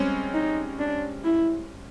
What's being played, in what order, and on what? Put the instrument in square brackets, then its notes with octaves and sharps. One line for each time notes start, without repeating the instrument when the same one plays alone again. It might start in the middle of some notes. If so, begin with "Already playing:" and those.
Already playing: [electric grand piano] G3 G#3 C4 C#4
[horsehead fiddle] D#4
D4
E4